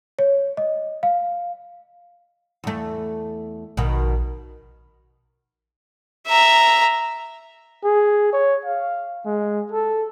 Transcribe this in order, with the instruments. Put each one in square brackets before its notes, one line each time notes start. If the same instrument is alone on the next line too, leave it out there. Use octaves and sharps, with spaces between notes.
[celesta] C#5
D#5
F5
[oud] E2 A3
[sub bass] A#1 [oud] B2 D#3
[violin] E5 A#5
[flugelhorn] G#4
C#5
F5
G#3
A4